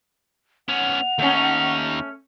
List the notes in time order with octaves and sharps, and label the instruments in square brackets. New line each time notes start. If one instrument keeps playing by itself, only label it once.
[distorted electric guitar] B3 C#4 [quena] F#5 [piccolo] F7
[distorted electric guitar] D#2 D#4 [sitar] A3 C#4